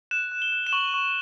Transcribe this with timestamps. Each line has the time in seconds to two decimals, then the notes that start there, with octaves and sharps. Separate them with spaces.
0.11 F#6 E7
0.32 F#6
0.42 G7
0.52 F#6
0.67 E7
0.72 C#6 F#7
0.94 C#6